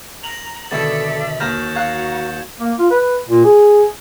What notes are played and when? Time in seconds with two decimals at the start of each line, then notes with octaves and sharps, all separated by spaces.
0.23 A#5 F7 F#7
0.71 B2 D3 D#3 A4 D5 E5 A6
1.40 D#2 F#4 A#5 F6 G6 E7
1.76 F5 A#5 F#6 G#6
2.60 A#3
2.79 F4
2.91 B4
3.29 A#2
3.45 G#4